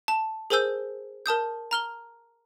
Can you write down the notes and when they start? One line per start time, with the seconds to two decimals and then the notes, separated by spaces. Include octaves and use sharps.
0.08 A5
0.50 G#4 A#4 C5 G#5 E6 G6
1.26 A#4 A5 D#6 G6
1.71 A#5 F6 G7